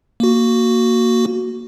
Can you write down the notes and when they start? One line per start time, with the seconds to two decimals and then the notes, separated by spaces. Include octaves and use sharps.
0.20 A#3 F#4